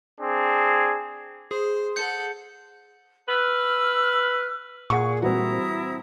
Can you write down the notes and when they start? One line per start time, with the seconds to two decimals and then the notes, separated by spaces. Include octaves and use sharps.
0.20 C4 D4 G#4
1.51 G#4 C5
1.96 A4 F#5 G6 C#7
3.29 B4 E6 F6
4.90 A#2 G#4 F#5 C#6
5.22 E3 G3 C4 E4 F#4 A#5 D#6